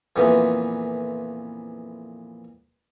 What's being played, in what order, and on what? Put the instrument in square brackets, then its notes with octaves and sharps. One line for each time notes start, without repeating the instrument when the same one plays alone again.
[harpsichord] F2 A#2 E3 B3